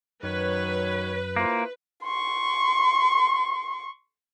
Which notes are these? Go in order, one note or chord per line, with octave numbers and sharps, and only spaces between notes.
F#2 D#3 F#3 B4 C#5
A#3 E4 F4 C5
C6 C#6